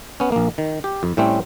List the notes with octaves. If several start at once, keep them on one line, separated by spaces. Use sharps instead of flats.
B3 C#4
A#1 A#3
D#3
G4
F2
A2 G3 A3 C4 C#4